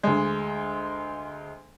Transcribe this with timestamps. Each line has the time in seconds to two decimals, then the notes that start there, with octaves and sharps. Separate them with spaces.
0.03 D2 G#3